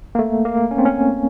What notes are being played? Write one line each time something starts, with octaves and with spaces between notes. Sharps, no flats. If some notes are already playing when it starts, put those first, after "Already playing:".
A#3
A3
A#3
C#4
C4
C#4